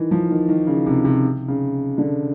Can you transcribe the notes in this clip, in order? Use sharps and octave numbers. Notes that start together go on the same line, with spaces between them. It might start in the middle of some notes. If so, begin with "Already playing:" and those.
Already playing: D#3 E3
F3
D#3
D#3
C#3
C3
C3
C#3
D3